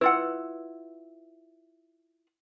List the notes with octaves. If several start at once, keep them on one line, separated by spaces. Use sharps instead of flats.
E4 F4 B4 F#5 E6